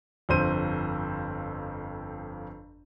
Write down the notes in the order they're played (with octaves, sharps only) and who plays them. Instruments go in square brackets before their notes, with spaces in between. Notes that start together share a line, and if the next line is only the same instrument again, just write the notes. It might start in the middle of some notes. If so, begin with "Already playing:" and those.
[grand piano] G1 F2 C5 D#7